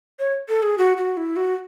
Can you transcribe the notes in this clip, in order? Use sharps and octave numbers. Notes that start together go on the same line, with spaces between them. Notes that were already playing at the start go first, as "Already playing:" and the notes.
C#5
A4
G#4
F#4
F#4
E4
F#4